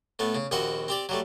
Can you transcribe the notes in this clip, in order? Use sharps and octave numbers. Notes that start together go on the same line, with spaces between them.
A2 A3 B3
C#3
A#1 D#2 C4 F#4 D#5 F#5
C4 G4 D5
F#3 G3 A3